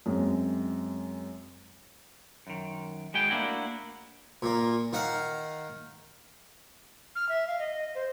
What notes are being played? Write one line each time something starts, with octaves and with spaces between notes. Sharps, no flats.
F#2 G#3 C4
F#2 D#3
G#3 B3 F#4 G#4 G5
A3 A#3 D4 E4 F#4
A#2 A#3
D#3 D#4 F5 F#5
F6
E5
F5
D#5
C5